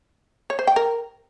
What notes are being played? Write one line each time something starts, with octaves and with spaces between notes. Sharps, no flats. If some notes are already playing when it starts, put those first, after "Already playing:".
C#5
C5
G5
A#4